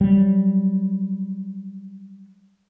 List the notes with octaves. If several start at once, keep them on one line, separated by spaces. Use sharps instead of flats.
F#3 G3